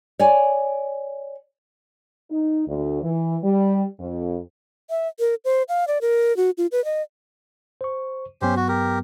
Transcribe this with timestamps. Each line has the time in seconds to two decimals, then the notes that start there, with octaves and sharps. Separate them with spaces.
0.19 C#5 D5 G#5
2.31 D#4
2.68 D2
3.03 E3
3.43 G3
3.99 F2
4.90 E5
5.19 A#4
5.45 C5
5.69 F5
5.88 D5
6.01 A#4
6.37 F#4
6.58 F4
6.72 B4
6.85 D#5
7.81 C5 C#6
8.42 G2 F#3 B3 C#4 G4 C5
8.56 F#4
8.68 G4 A#4